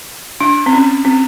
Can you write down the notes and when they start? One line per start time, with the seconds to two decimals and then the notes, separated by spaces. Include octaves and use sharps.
0.41 D4
0.66 C4
0.73 C#4
1.05 C4